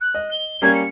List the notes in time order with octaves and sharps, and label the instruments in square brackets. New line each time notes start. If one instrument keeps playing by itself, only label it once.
[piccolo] F#6
[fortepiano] D#5
[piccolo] G7
[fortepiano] G3 A#3 C#4 [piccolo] G#6
[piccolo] C#7